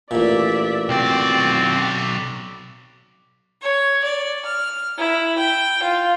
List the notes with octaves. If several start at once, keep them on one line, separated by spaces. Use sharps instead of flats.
A1 A#2 D5 E5
B1 C4 F#4 D5
C#5
D5
F6
E4
G5
F4